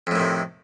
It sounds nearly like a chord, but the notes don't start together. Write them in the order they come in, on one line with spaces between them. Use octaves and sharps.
F2 A2 D#3 C3